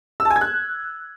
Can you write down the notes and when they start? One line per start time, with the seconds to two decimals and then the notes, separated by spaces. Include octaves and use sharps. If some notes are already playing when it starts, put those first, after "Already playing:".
0.20 E6
0.25 A5
0.31 G#5
0.36 G#6
0.41 F#6